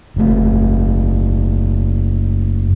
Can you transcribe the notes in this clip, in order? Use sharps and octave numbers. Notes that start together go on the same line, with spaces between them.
F#1 A3